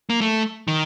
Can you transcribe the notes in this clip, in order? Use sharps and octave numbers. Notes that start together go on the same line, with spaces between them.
A#3
A3
D#3